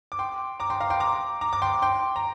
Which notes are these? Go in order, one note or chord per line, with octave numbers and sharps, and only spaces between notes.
D6
G5 C6
A#5 D6
G5 C6
F5 A#5
G5 C6
A#5 D6
A#5 D6
D6
G5 C6
G5 C6
A#5